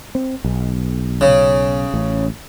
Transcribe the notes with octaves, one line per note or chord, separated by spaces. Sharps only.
C4
B1
C#3
A1